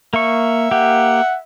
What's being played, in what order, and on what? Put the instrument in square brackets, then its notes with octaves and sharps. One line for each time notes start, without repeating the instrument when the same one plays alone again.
[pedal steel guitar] A#3 C#6 [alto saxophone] E5
[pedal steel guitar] A#3 G4 [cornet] F#5